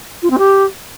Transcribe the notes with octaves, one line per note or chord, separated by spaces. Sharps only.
F4
C4
G4